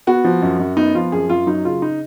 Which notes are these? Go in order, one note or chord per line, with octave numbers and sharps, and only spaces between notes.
B3 F#4
F3
F#2
F#2
B3 D#4
F3 F4
F#2 G#4
F#2 F4
F#3 D#4
C#3 F4
D#4